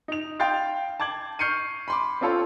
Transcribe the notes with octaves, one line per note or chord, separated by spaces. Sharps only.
D#4 F7
F5 G5 C6 G6 A6 C7
A5 D6 G#6 F#7
C#6 F6 G6 C7 C#7 D#7
B5 C6 D6
C4 C#4 F4 A4 C#5 C6